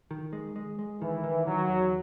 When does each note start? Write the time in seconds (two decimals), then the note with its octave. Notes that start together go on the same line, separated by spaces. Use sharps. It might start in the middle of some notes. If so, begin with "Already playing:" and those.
0.11 D#3
0.33 G#3
0.56 G#3
0.79 G#3
1.01 D#3 E3
1.24 D#3
1.46 D#3 F#3
1.69 E2